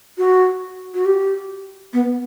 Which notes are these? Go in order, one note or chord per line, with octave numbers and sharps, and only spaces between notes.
F#4
F#4
G4
B3